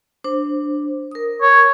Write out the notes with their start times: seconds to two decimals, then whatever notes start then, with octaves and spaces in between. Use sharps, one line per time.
0.24 D4 C5
1.11 A#4 D#6
1.42 C#5